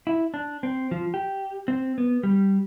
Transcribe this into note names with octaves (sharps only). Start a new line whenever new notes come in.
E4
D4
C4
F3
G4
C4
B3
G3